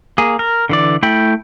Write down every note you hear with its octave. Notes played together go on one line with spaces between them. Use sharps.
A#3 G#4
A#4
D3 E3 D5
A3 E4 G5 B5